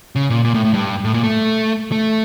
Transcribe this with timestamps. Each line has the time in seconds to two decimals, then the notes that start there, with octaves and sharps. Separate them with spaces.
0.16 C#3
0.30 A#2
0.45 A#2
0.54 A2
0.65 A2
0.74 G2
1.04 A2
1.14 A#2
1.24 A3
1.92 A3